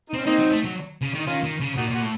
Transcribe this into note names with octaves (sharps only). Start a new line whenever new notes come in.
D#4
C4
C#4
A#3 C4 D#4
F#3
A3
F#3
C#3
D#3
D#4
D#3 C#4 F4
D#3
C#3
A#2 D#4 F#4
A#2 F#4
A2